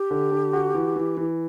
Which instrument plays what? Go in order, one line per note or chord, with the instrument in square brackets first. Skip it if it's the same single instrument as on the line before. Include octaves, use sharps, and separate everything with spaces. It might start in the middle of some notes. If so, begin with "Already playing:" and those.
Already playing: [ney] G4
[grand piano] D3
D3
F#4
E3
E3
E3